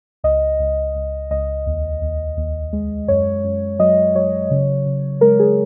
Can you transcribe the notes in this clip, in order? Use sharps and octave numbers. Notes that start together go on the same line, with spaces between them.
C#2 D#5
C#2
C#2
C#2 D#5
D#2
D#2
D#2
G#3
F#2 C#5
F#2
F#3 D#5
F#3 C#5
C#3
C#3
G#3 A#4
G#4